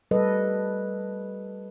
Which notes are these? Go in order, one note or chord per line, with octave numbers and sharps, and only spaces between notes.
G3 A4 B4 D#5